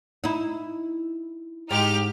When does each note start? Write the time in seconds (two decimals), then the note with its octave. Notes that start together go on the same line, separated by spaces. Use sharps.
0.24 D#4 E4
1.71 G#2 D#4 G4 F6